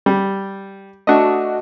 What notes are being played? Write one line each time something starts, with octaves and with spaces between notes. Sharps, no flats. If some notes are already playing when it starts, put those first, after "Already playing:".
G3
A3 D4 F#4 D#5